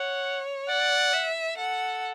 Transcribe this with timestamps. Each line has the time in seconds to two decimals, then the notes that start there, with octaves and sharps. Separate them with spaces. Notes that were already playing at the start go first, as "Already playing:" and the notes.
Already playing: C#5 F#5
0.69 D5 F#5
1.13 E5
1.57 A4 F#5